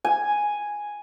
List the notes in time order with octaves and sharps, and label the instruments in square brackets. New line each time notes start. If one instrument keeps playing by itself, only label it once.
[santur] G#5